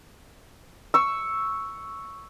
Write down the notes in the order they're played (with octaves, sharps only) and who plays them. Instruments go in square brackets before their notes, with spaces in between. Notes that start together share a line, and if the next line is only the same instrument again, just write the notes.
[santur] C#6 E6